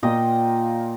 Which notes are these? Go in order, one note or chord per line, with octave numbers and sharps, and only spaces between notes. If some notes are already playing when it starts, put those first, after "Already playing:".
A#2 A#3 F4 D#5 G5